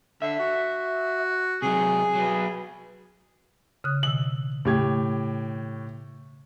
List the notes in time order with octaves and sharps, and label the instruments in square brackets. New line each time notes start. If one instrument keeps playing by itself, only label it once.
[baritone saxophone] D3 [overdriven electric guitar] E5
[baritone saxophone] F#4
[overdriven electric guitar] C3 F#3 [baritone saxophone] G#4
[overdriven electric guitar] F#3 B4
[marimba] C#3 D#6 F#6
[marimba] B2 D#3 E6 [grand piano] F#7
[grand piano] A2 G4 G#6 [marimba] C#3